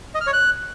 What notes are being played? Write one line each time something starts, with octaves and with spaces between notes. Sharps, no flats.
D#5
F6
C#5
F#6